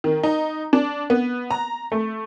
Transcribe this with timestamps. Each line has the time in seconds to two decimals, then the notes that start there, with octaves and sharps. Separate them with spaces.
0.04 D#3
0.23 D#4
0.73 D4
1.10 B3
1.51 A#5
1.92 A3